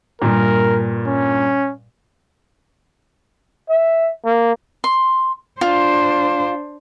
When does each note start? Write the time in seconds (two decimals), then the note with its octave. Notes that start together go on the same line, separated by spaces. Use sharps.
0.22 G2 A#2 A#4
1.07 C#4
3.69 E5
4.25 A#3
4.84 C6
5.61 D4 F4 C5